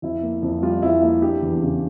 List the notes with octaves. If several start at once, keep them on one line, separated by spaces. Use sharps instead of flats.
F2 E4
A#3
F2
G3 F4
F2 E4
A#3 E4
D4 G4
E2
C#3